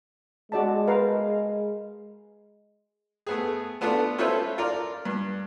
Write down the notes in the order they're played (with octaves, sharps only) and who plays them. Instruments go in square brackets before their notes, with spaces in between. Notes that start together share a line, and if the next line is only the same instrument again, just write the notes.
[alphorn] G#3 [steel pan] F#4 D5 A5
[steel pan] A#4 B4 F5
[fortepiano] A3 B3 G#4
A3 B3 D4 F4 A4
C#4 F4 A4 B4 C5 E5
F4 A#4 D5
G2